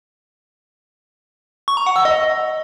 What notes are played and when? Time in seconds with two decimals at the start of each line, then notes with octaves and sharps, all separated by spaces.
1.68 C#6
1.77 A#5
1.86 F#5
1.96 E6
2.05 D#5